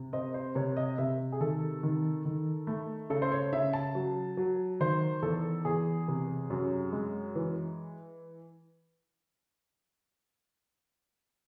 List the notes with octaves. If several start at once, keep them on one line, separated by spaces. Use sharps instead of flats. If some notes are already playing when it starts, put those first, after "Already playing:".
Already playing: C3
C4 D#5
C5
C3 C#5
D#5
C3 E5
G#4
D#3 A4
D#3
D#3
A3
C#3 A4
C5
C#5
C#3 E5
A5
F#3
F#3
D#3 C5
E2 A4
E2 G#4
C3
F#2
G#3
E3